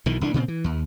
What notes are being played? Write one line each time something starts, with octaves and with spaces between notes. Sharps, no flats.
B1 B2 D#3 E3
C2 E3 D4
A#2 C#3 A#3 C4
E3
D#2